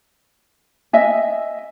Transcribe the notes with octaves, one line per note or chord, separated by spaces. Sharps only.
D#5 E5 G#5